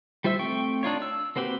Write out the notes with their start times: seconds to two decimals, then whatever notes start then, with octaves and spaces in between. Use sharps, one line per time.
0.24 G3 F4 C5 E5 E6
0.39 A3 C4 G5 C#6
0.83 D4 D#4 F4 C#5
1.02 E6
1.36 A#3 C4 F#4 G4 B4